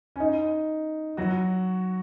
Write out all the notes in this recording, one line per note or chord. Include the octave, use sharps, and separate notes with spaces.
C#4
D#4
F#3 F#4